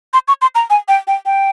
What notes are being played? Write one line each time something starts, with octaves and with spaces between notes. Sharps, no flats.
C6
C#6
C6
A#5
G#5
G5
G5
G5